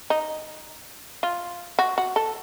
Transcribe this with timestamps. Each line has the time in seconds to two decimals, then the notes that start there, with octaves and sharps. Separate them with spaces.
0.10 D#4
1.23 F4
1.79 F#4
1.98 F#4
2.16 A4